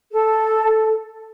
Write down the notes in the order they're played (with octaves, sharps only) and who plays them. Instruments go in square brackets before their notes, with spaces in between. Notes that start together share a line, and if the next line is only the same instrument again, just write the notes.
[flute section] A4